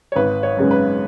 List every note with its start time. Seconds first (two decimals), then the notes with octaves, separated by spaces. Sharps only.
0.12 C#5
0.16 G#1 B4
0.43 C#5
0.57 F#2 C#3 G#3 B3
0.71 B4